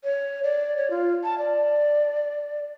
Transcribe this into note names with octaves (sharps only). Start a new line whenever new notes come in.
C#5
D5
C#5
F4
A5
D5